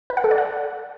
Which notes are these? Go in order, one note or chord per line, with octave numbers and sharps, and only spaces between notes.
B4
F#5
A4
D5
F#5